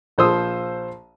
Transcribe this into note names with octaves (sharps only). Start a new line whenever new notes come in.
A#1 F3 C5 C6 D#6 E6